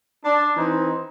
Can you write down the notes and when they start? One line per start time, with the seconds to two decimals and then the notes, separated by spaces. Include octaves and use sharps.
0.24 D4
0.56 E3 C4 D#4